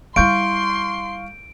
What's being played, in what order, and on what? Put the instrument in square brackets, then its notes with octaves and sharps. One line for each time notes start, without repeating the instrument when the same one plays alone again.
[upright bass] G3 E4 [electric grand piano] F5 C#6 G6 [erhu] C6 [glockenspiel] D7